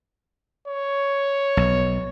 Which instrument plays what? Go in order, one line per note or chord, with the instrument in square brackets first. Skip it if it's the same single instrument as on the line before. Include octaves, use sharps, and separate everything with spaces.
[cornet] C#5
[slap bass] B1